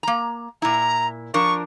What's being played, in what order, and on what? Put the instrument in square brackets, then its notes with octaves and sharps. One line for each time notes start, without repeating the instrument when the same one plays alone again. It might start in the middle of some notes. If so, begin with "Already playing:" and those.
[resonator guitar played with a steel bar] A#3 A#5
[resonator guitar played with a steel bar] A#2 E4 [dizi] A#5
[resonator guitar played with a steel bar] F3 D4 A#4 [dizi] C#6